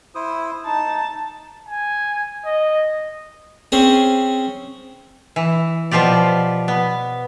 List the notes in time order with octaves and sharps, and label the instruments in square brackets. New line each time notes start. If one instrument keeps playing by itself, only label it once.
[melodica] E4 C5 D#6
[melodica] D#4 [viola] A5
[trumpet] G#5
D#5
[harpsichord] C4 C#4 G#4
[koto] E3
B2 F3 F4 G4 D5
B3